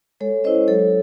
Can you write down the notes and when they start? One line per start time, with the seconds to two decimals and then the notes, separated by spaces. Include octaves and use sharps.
0.20 G#3 A4 C#5
0.44 C#4 E4 C5 D#5
0.68 F#3 A4 C#5